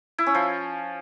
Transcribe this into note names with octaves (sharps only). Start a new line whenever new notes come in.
E4
C#4
F3